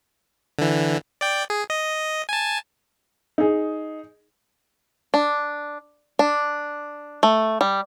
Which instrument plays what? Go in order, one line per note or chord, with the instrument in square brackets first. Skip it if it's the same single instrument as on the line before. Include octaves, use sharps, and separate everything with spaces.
[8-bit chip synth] D3 E3
D5 G5
G#4
D#5
G#5 A5
[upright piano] D#4 G#4
[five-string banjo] D4
D4
A3
G3